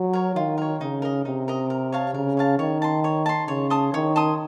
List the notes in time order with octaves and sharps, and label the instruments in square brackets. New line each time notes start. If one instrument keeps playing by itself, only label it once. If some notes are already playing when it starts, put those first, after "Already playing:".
Already playing: [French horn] F#3
[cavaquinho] A#4 C#5
[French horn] D#3 [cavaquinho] F4
[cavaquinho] A#4 C#5
[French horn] C#3 [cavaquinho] D#4
[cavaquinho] A#4 D#5
[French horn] C3 [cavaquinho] D#4
[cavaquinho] A#4 D#5
A#4
C#5 F5 A5
[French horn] C#3 [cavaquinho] A#4
[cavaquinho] C#5 F5 A5
[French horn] D#3 [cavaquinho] C#5
[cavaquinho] A5 C6
C#5
A5 C6
[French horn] C#3 [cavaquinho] C#5
[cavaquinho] A5 C6 D#6
[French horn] D#3 [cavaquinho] C#5
[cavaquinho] A5 C6 D#6